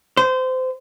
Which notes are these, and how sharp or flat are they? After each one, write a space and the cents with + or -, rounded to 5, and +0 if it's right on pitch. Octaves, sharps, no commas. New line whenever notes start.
C5 -25